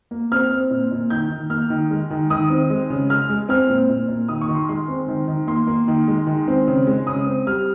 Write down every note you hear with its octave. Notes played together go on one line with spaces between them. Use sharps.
A#3
C4 F6
C4
A#2
A#2
D#3 G6
D#3
A#3 F6
D#3
G#3
D#3
D#3 D#6
C4
G#3
C#3
G#3 F6
G#3
C4 F6
A#2
A#2
A#2
D#3 D#6
C#6
D#3
C6
G#3 C6
C4
D#3
D#3
A#3 C6
A#3
D#3
G#3
D#3
C4
C#3
G#3
C#3 D#6
C4
G3 F6